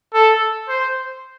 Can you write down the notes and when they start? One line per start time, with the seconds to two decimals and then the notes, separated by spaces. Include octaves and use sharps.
0.14 A4
0.69 C5